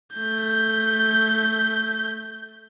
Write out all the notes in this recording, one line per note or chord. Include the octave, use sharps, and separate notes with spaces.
A3 G6